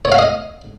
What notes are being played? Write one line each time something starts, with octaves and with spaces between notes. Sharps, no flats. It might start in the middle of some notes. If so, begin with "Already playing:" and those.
C#5
F5
D#5